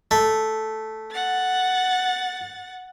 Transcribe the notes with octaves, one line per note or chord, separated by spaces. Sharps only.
A3
F#5 A6